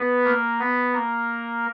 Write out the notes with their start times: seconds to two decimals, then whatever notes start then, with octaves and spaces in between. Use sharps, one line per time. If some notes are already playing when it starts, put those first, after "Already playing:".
Already playing: B3 B4
0.24 A#3 A#4
0.59 B3 B4
0.93 A#3 A#4